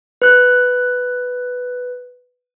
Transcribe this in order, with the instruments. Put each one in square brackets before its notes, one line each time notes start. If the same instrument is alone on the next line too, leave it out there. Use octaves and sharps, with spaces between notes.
[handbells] B4 F#6